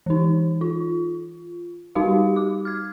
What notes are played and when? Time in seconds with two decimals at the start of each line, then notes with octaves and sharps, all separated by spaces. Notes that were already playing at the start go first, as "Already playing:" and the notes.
0.06 E3 D#4
0.61 F4
1.95 G3 D#4 F#4 G4 F5
2.36 D6
2.65 F6 G#6